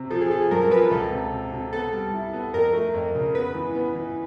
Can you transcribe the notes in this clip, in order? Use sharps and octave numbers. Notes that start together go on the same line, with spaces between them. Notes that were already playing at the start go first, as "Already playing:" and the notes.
Already playing: C3
F3 A4
G#4
F3 A4
G#4
F#2 A#4
A#4
F3 B4
A#4
C#2 A4
C3
C3
C3
B3 A4
G3
E4
B3
F2 A#4
A3
F2
C#3
B3 B4
E3
B3
E3